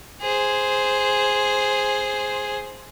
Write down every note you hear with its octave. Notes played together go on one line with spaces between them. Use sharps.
G#4 C5